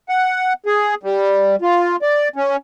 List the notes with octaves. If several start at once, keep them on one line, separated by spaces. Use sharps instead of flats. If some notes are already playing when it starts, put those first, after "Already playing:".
F#5
G#4
G3
F4
D5
C#4